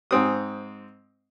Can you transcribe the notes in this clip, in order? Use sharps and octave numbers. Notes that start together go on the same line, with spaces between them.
G#2 C4 D#6